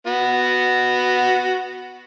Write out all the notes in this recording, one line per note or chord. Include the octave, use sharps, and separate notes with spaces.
B3 F#4